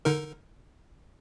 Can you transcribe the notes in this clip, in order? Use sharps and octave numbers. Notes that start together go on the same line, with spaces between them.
D3 D#4 A#4